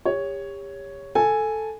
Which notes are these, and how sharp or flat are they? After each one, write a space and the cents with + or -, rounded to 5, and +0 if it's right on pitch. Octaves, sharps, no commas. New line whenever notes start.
G4 +35 C#5 +5
A4 +0 G#5 +0